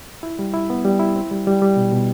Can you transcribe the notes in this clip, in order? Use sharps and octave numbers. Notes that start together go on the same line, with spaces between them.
E4
G3
E4
B3
G3
E4
C4
G3
G3
G3
B2
B2